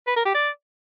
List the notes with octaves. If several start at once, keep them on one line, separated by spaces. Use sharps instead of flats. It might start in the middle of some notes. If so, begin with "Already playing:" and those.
B4
A#4
G4
D5